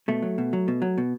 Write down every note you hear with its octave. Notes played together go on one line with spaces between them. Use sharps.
B2 A3
F#3
B2
F#3
B2
F#3
B2